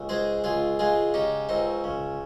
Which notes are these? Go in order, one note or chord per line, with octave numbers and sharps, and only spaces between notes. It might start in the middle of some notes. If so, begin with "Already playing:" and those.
Already playing: C#2
G#3 G#4 C5
C#2 F4 G#4
G#3 F4 G#4
C#3 D#4 G4
C#2 C4 D#4
C#3